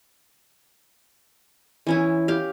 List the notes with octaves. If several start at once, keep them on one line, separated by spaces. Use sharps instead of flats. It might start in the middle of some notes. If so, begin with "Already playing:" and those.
E3 C#4 E4
G4 F5